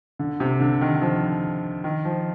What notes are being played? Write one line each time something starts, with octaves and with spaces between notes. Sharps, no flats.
D3
C3
D3
D#3
D#3
F3
D#3
F3